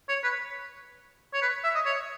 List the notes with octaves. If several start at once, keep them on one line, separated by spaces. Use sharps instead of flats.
C#5
B4
C#5
B4
E5
D#5
C#5